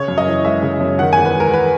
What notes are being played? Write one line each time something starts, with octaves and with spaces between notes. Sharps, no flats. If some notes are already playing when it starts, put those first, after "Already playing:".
Already playing: C#3 C#5
F#2
D#5
E3
G#3 E5
C#3
F#2
D#3 F#5
E2 G#5
B4
G#3
A#4
B4